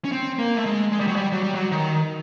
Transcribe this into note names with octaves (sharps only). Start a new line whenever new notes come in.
C#4
C4
A#3
A3
G#3
G#3
G3
F#3
G3
F#3
G3
F#3
D#3